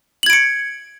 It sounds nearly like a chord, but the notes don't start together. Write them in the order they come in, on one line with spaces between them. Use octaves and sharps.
F#7 G#6 D7 C#7